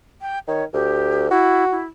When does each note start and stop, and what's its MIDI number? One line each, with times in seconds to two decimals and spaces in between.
0.21 0.39 79
0.48 0.63 51
0.48 0.65 73
0.73 1.28 38
0.73 1.27 67
1.30 1.65 64
1.30 1.81 66
1.72 1.85 64